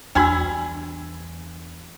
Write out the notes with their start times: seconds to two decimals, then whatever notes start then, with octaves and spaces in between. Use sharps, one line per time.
0.15 E2 G3 D4 F#4 G#5 B5 E6